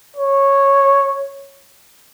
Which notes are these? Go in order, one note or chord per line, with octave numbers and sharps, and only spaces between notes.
C#5